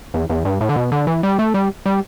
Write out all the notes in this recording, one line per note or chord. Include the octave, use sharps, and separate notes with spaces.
E2
E2
G2
A2
D3
B2
D3
E3
G3
A3
G3
G3